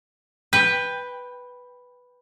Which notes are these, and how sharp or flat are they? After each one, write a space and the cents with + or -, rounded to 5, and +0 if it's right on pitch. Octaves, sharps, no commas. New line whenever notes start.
B4 +0 G5 +15